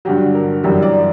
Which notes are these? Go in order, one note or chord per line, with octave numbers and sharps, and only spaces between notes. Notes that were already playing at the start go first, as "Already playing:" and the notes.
G2 D3 F#3 G4
A#4
F#2 E3 G3 G4
D5